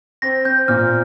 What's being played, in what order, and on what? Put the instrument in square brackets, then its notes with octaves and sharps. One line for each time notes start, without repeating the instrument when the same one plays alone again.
[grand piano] C4 [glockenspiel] A#6
[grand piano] C4 [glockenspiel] G6
[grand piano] A#2 [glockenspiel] F6